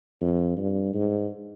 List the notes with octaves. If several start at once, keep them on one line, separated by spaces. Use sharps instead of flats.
F2
G2
G#2